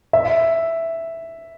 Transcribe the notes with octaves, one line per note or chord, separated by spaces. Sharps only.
E5